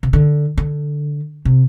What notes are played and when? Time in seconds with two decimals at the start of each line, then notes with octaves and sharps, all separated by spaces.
0.03 C3
0.13 D3
0.58 D3
1.45 C3